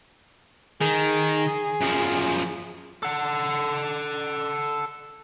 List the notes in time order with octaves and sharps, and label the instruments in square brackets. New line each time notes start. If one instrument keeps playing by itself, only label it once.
[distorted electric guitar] D#3 [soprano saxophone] G#4
[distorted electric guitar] F#2 F3
[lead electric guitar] A4 F#5